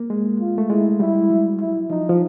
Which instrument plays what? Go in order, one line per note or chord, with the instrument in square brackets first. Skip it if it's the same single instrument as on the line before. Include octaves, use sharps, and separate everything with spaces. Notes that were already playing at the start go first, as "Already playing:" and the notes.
Already playing: [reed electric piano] A#3
G#3
[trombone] F4
[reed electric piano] A3
[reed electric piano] G#3 [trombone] E4
[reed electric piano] G3 [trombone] E4
[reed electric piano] G#3
F#3
[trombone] E4
[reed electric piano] F3 [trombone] D#4
[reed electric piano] F3